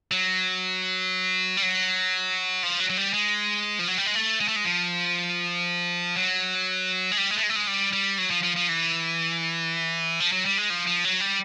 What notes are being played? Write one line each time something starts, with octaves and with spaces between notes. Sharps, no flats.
F#3
G3
F#3
F3
F#3
F#3
G3
G#3
F3
F#3
G3
G#3
A3
G#3
A3
G#3
F3
F#3
G#3
G3
G#3
A3
G#3
A3
G#3
G3
G3
F#3
F3
F3
F3
E3
F3
F#3
G3
G#3
F3
F3
F#3
G3